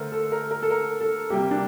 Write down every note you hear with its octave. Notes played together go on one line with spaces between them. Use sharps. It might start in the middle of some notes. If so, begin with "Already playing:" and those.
Already playing: D3 A3 A4 A#4 C5
A4
A#4
A#4
A4
A#4
A4
C3 G3 A#3 G4
D4